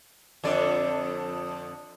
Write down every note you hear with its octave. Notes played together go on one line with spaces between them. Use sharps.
F2 D3 D5